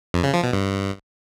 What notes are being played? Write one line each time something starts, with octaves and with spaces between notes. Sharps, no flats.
F2
C#3
F3
B2
G2